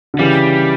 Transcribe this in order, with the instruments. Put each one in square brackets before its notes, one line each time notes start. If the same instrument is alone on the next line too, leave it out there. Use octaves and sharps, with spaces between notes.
[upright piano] D3
[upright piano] C#3 E3 [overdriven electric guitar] G3